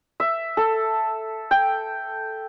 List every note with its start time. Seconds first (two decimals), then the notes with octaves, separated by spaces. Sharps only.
0.20 E5
0.57 A4
1.51 G5